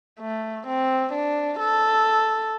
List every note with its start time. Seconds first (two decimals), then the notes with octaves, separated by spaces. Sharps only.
0.20 A3
0.67 C4
1.13 D4
1.59 A4